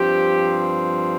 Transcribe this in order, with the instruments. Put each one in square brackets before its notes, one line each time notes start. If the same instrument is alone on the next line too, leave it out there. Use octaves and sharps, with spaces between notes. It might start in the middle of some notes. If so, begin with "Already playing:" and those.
Already playing: [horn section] G2 F3 C4 G4